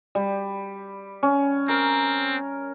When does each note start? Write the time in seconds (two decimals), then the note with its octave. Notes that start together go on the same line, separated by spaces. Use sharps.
0.15 G3
1.23 C#4
1.69 C4 A#4